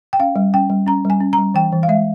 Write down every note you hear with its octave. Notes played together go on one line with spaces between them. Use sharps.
G5
C#4 F5
G3
C#4 G5
G3
C#4 A#5
G3
G#5
C#4
A#5
G3
E3 G5
E3
F5
G#3 E5